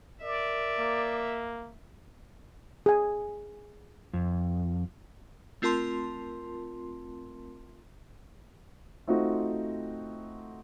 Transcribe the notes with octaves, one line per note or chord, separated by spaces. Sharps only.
A#4 D5 E5
A#3
G#4 G#5
F2
A3 C4 F4 A#4 A5 C6
A3 C4 D#4 F4 F#4